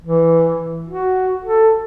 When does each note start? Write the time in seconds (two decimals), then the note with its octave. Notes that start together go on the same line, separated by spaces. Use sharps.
0.04 E3
0.89 F#4
1.44 A4